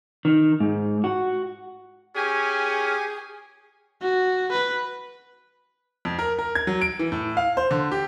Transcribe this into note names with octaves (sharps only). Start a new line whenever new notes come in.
D#3
G#2
F#4
C#4 G4 G#4 G#5
F#4
B4
F2
A#4
A#4
G#6
F#3
D7
E3
A2
F5
C5
D3
G4